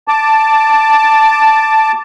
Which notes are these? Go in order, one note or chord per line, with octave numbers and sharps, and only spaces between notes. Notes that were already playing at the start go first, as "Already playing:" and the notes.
A5 D6